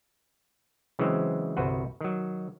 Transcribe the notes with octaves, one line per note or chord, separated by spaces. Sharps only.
C#3 E3 F#3 G#3 C4 C5
G1 C2 F#4 B4 C5 F#5
D#3 F#3